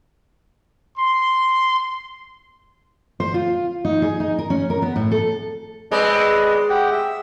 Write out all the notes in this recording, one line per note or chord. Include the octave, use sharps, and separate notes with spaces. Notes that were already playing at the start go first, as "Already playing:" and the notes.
C6
C5
F4
D#4
G#4
D#4
A#4
C#4
A#4
B3
A2
A4
G#3 C4 B4 D5 D#5
G4 F#5 G5
E5